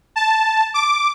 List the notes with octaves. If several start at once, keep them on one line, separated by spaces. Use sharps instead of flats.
A5
D6